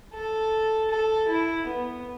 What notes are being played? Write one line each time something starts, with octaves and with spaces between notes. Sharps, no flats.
A4
A4
E4
B3